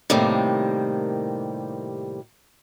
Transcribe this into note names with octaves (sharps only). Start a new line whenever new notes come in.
A2 C3 D#3 G3 A3 A#3